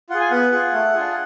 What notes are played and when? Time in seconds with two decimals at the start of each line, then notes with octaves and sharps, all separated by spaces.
0.10 F4 F#5
0.15 G#4
0.21 G#5
0.31 B3 F#5
0.52 F4 G#4
0.73 A3
0.94 D4 F4 G#4